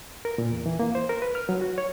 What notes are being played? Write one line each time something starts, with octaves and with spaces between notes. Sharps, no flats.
A#4
A#2
E2
E3
A#3
C5
A#4
B4
F6
F#3
F#4
C#5